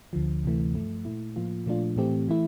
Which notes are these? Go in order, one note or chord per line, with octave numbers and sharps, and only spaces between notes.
D2 D3 F3
D2 C3 E3 A3
G2 F3 A3
A#2 A3 E4
A2 F3 A#3 F4
A#2 F3 A3 D4 F4
A2 E3 A3 C4 G4
E3 A3 E4